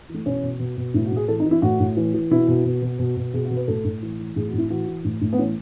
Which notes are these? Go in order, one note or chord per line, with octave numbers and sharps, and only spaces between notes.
E3
A3
B2 C#4
B2
B2
B2
A2 E4
F#4
A2 G#4
E3 A4
D#4
E3
E4
A2 F#4
A2
E3
E3
B2 E4
B2
B2
B2
B2
B2
B2 G#4
F#4
B2
B4
A2 A4
A2
E3
E3
A2 G#4
F#4
A2
E4
E3 F#4
E3
A2
A2
B3
E3 C#4